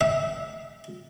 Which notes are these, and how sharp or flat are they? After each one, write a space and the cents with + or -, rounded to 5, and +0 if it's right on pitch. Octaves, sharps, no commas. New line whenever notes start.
E5 -20